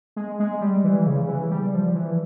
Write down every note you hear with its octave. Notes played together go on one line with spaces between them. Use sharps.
G#3
G#3
G3
E3
C#3
E3
G3
F3
E3